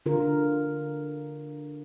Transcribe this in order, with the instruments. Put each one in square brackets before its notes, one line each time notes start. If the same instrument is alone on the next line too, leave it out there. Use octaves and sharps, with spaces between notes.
[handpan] D3 F4 A#4